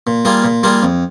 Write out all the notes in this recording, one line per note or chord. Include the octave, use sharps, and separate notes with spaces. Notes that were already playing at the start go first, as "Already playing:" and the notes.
A#2
G3 A#3 F4 G#4
A#2
G3 A#3 F4 G#4
F2